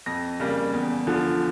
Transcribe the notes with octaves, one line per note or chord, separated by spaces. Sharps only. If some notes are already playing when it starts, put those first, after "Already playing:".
F2 A#6
C#3 G3 A#3
E2
D3 F3